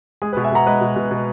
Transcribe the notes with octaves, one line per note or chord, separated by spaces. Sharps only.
G#3 G#4
B2 G#4 B4
E5 G#5
B2 F#5 A#5
G#3 B4 D#5
B2
B2
B2